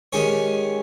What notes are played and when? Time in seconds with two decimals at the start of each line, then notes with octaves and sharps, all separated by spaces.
0.13 D#3 G#3 C#4 G4 C#5